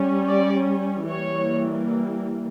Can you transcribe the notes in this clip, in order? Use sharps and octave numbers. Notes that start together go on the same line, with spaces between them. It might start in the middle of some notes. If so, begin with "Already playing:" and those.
Already playing: G3 C#4
D5
E3 G3 A#3 C#5